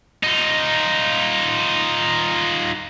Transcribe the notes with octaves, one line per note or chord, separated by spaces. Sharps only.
D#4 F4